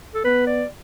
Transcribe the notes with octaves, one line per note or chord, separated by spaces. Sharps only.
A4
B3 B4
D5